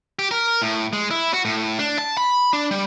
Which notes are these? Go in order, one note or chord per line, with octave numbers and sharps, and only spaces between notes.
G4
A#4
A2
G#3
E4
F#4
A2
D4
A5
B5
D4
G3